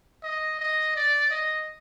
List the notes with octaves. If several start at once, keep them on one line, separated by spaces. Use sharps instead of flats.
D#5
D#5
D5
D#5